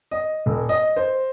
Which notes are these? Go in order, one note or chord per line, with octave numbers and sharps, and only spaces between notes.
D#5
D#1
D#5
C5